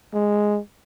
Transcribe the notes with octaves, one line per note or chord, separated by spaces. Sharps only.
G#3